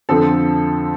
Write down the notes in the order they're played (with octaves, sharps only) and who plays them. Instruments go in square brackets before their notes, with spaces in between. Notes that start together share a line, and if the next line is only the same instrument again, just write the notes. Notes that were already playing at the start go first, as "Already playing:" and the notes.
[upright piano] F2 D3 F3 C4 A4